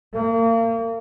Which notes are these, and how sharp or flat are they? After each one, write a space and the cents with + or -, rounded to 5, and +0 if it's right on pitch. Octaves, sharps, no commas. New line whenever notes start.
A#3 -35